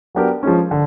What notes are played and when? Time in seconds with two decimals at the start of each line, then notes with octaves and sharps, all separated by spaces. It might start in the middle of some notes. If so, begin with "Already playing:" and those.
0.15 F#3 B3 D4 G4 A#4
0.43 F3 G#3 C#4
0.71 D3